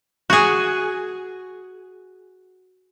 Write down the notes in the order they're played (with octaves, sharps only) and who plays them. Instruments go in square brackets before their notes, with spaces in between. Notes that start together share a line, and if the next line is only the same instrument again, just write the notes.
[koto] F#4 G#4